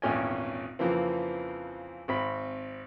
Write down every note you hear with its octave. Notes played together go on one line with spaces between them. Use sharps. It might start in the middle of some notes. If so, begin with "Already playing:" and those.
G#1 E2 A#2 C#4 G5 G#5
F2 C#3 E3 F3 A#3 C4
G#1 C4 B5